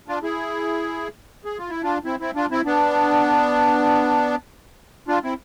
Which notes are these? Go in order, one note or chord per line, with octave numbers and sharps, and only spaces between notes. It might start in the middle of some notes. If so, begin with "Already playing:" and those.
D4 F4
E4 G#4
G#4
F4
E4
D4 F4
C4 E4
C4 E4
D4 F4
C4 E4
B3 D4
D4 F4
C4 E4